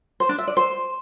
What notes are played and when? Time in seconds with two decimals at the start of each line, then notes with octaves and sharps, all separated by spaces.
0.20 C5
0.29 D4
0.38 E5
0.48 D5
0.57 C5